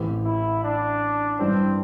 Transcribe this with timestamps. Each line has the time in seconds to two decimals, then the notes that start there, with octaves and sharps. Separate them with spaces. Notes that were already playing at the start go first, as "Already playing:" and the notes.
Already playing: A1 A2 E3 C4 G4
0.25 E4
0.63 D4
1.39 G2 E3 G3 C4 D4